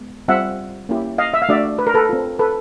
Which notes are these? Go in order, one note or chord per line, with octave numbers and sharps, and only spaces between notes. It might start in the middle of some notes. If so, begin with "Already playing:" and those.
Already playing: G#3 B3
G3 C4 F4 E5 F#5
A#3 C#4 E4 G4
D#5 F5
E5
F5
A3 D4 F#4 D5 E5
B4
A#4
A4 B4
C4 F4
A4 B4